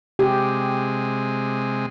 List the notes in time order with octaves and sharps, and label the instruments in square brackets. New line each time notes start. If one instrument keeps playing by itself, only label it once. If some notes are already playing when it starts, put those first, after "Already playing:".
[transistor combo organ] C3 G#3 [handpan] G4